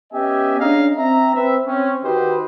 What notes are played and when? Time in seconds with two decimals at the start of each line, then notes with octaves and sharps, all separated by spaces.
0.13 B3 C#4 G4 D#5 E5 G#5
0.60 C#4 D4 G#4 D#5 F5 A#5
0.98 C4 E5 A#5
1.35 C4 B4 E5
1.67 C4 C#4
2.03 D#3 F#4 G4 B4 C5 D#5